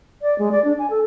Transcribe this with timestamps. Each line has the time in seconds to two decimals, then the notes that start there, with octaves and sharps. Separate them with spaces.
0.22 D5
0.38 G#3
0.52 D5
0.64 D4
0.79 G#5
0.90 A4